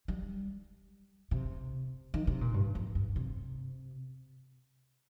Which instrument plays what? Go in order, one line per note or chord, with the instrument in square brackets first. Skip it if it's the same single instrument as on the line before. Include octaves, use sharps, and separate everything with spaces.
[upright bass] G3
C3
D#3
C3
A#2
G2
F2
G2
C3